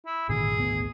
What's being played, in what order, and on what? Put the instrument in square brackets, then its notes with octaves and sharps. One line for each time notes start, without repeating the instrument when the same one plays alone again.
[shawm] E4
[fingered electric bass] G#1 A#2 D3 [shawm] G#4
[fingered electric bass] G#1 D2 B3